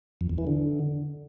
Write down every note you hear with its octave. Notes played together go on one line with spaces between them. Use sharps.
F2
E2
E3
D3